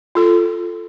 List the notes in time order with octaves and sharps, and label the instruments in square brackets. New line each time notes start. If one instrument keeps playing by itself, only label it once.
[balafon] F4 A4